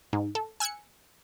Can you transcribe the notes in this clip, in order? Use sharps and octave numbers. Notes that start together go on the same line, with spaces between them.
G#2
A4
G#5 E6 F#6 G#6 C#7